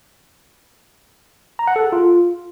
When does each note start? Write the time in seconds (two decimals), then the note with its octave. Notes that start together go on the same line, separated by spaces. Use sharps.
1.59 A#5
1.67 F#5
1.76 A4
1.84 G#4
1.92 F4